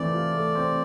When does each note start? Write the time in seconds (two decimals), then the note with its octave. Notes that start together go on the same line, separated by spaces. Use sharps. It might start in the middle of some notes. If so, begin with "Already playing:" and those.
Already playing: E3 A3 C4 D5
0.12 F4
0.34 A3
0.55 C4